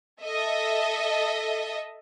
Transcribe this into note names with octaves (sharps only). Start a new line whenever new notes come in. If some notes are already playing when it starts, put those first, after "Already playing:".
A4 D#5 E5